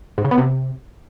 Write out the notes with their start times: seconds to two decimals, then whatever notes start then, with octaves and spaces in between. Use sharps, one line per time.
0.18 G#2
0.25 C#3
0.31 B3
0.38 C3